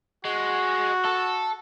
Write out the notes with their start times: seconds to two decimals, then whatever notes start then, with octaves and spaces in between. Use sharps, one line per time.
0.25 G#3 F#4
1.05 A4